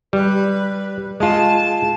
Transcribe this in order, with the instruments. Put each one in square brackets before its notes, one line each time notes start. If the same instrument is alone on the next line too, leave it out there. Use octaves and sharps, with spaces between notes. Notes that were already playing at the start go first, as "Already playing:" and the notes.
[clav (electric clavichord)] G3 [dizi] B4
[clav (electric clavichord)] G#3 F4 [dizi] A5